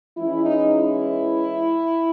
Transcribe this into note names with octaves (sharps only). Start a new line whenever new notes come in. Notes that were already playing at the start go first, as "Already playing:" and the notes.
E3 G#3 C#4 E4
D#4
E4